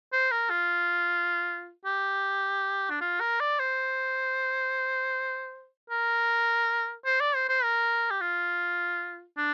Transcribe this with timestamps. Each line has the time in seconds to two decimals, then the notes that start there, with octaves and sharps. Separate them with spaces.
0.13 C5
0.32 A#4
0.50 F4
1.85 G4
2.90 D4
3.01 F4
3.20 A#4
3.40 D5
3.60 C5
5.90 A#4
7.05 C5
7.21 D5
7.35 C5
7.49 C5
7.64 A#4
8.11 G4
8.21 F4
9.37 D4